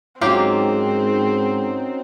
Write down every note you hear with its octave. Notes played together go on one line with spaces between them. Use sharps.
G#2 F#3 A#3 C4 C#4 D#4 F4 G4